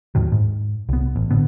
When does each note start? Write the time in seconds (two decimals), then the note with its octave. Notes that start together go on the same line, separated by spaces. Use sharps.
0.15 D#2 A2 D#3 F#3
0.32 G#2
0.89 C2 B3
1.16 A1
1.31 A2 D3 B3